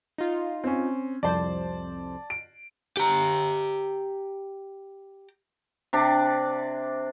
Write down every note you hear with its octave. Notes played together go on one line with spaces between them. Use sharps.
D#4 F4
C4 C#4
C2 F2 C5 D5 A5
D7
G4 A#5
C3 D4 D5